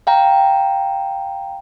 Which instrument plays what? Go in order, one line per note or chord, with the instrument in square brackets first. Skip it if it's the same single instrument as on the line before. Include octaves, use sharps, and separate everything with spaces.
[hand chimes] F5 G5 A#5